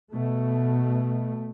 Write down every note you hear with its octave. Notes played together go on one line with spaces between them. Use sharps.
B2 A3